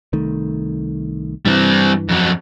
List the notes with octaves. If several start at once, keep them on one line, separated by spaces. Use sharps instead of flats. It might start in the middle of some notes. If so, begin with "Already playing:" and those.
C2 D#3 A3
G2 E3 G3 C4
F2 F#3